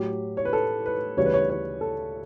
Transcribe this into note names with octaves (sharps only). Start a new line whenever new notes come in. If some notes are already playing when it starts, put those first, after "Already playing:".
Already playing: A2 F#3 G4
C#5
B4
A4
B4
D2 C#3 E3 G3 C#5
B4
C#5
C#5
A4